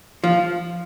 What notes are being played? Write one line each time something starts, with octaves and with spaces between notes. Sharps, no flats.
F3